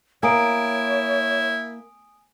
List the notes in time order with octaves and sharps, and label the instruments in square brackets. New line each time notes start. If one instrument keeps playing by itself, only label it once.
[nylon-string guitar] A#3 [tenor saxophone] E4 [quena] C#5 [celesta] G#5 D#6 D7